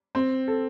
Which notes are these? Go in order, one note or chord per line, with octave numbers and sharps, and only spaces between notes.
C4
A4